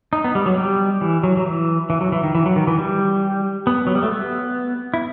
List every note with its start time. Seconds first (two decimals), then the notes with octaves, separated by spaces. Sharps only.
0.13 D#4
0.24 B3
0.35 G3
0.46 F#3
0.58 G3
1.01 E3
1.23 F#3
1.37 F#3
1.46 E3
1.90 E3
2.01 F#3
2.12 E3
2.23 D#3
2.35 E3
2.46 F#3
2.56 D#3
2.67 E3
2.78 G3
3.67 B3
3.87 F#3
3.95 G3
4.03 A3
4.11 B3
4.94 E4